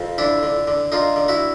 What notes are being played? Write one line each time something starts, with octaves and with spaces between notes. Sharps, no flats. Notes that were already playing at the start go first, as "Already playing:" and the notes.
Already playing: F2
D3 D4 E4
D3
D3
D3 D#4 F4
D3
E4 F#4